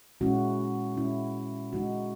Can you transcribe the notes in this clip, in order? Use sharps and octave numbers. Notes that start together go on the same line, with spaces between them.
A#2 G#3 C#4 E4 F#4
A#2 G#3 C#4 E4
C#3 G#3 D#4 F#4